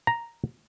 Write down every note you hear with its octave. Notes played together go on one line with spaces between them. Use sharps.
A#5